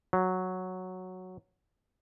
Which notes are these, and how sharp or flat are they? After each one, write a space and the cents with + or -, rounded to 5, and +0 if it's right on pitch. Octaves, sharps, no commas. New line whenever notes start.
F#3 -5